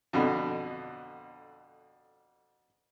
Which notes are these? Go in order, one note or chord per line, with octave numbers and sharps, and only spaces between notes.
F2 B2 D3